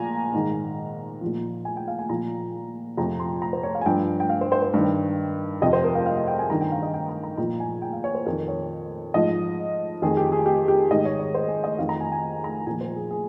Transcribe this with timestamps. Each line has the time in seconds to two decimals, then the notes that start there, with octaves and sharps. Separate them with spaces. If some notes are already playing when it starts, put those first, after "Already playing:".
Already playing: A#2 F3 G#5 A#5
0.33 G#2 D#3
1.21 F3
1.26 A#2
1.65 G#5
1.77 G5
1.88 F5
1.99 G#5
2.09 A#2 F3 A#5
2.97 F2 C3 F3 A#5
3.20 C6
3.42 A#5
3.53 C5
3.63 C#5
3.75 F5
3.81 G#5
3.86 G2 F3 G5
4.20 G5
4.29 F5
4.41 C5
4.52 C5
4.62 C5
4.74 G2 D#3
5.62 F2 C3 F3 D#5
5.73 C5
5.84 A#4
5.95 F5
6.06 F5
6.17 F5
6.27 G5
6.39 G#5
6.50 G2 D#3 A#5
6.61 G5
6.72 F5
6.83 D#5
6.94 G5
7.09 A#5
7.23 A#5
7.37 A#2 F3 A#5
7.60 G#5
7.82 G5
7.93 F5
8.04 C#5
8.15 C5
8.26 F2 D#3 A#4
8.48 C#5
9.14 G#2 F3 D#5
10.02 F2 D#3 G#4
10.17 G4
10.32 G#4
10.46 G4
10.68 G4
10.90 G#2 D#3 D#5
11.05 C#5
11.19 C#5
11.34 C5
11.48 G#4
11.64 D#5
11.78 F2 D#3 F5
11.89 A#5
12.00 G#5
12.12 G#5
12.44 A#5
12.66 A#2 F3 G#5
12.81 C5
12.96 G#4
13.11 G#4